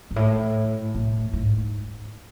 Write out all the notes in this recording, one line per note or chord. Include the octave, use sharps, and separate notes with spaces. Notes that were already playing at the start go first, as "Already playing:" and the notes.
G#2
A2
A2
G#2